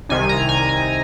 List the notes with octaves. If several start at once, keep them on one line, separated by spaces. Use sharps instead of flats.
C2 C3 D#3 G#5
A#5
G#5
G#5